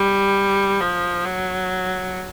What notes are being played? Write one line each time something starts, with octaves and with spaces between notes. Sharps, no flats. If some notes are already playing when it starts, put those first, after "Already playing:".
Already playing: G3
F3
F#3